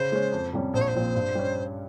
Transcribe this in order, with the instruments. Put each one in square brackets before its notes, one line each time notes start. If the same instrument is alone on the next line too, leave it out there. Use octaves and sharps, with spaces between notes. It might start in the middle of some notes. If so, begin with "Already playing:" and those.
Already playing: [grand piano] C#3 [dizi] C5
[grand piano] G#3 C#4
F2
C3 G3 C#4
[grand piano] A#1 [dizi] C5
[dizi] C#5
C5
[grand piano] A#2 F3 C4
G2
G3 C#4